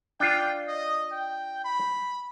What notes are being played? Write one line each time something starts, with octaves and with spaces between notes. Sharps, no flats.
D4 F4 G5
D#5
G5
B5